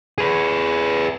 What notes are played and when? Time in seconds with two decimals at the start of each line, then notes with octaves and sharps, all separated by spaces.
0.18 G#4 B4